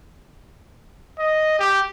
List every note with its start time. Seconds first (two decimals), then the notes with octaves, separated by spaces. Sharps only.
1.19 D#5
1.60 G4